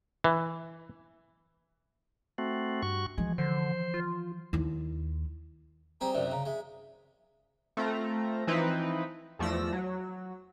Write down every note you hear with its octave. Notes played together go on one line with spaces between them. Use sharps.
E3
A3 C4 F#4
G2 F#4 C#6
E3 F3 G#3
D3 C5
F4
D#2 E4
G3 C4 G#4 A#5
F#2 C3 D#3 D5
C#3 A#5
G#3 E5
A3 C4 F4 A#5
E3 F3 C4 D#4 E4 B4
E2 F3 A3 D5 E6 A#6
F#3